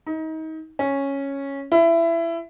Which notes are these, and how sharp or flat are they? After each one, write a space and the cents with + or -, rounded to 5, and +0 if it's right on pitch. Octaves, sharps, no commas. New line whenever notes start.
D#4 +30
C#4 -5
E4 +20